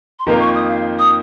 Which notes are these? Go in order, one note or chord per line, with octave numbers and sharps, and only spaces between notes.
C6
F2 D#3 A#3 F4 A#5
C#6
D#6
F5
D#6